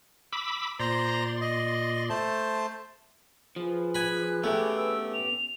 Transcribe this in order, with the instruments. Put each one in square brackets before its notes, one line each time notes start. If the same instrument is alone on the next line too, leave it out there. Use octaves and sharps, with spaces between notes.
[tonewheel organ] B5 D6 E6
[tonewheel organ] A#2 D5 C6 [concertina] C5 A#5
[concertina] D#5
A3 C5 A5
[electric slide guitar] F3 [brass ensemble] G#4 B4
[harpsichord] G#5 B5 [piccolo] F#6
[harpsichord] A3 [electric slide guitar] B3 C#4 G4
[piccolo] E6
F7